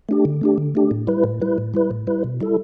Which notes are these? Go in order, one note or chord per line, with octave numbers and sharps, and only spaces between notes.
A3 D4 G4
D3
A3 D4 G4
D3
A3 D4 G4
A2
G3 E4 B4
A2
G3 E4 B4
A2
G3 E4 B4
A2
G3 E4 B4
B2
G3 E4 A4